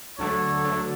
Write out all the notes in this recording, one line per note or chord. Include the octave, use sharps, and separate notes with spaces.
D2 D3 F#3 A3 D4 A4 C#5
D2 D3 F#3 A3 D4